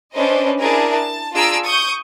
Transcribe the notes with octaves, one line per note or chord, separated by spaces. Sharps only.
C#4 D4 B4 C5 D#5
D4 E4 G#4 A#4
A5
D4 F4 G#4 A#5 E6 D7
C#6 D#6 G6